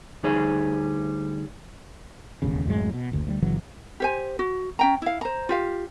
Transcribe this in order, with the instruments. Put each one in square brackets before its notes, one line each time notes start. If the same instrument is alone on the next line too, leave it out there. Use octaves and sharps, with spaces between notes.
[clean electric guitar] D2 G3 D#4 G#4 C#5 G#5
[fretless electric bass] E1 A1 D#2 C#3
D1 F#2 A2 G#3
B2
F#1 D2
D2 F3 G3
G1 C#3 E3 F#3
[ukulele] G4 C5 G#5
F#4
C#4 G5 A#5
E4 F5
C5 A#5
F4 G4 F5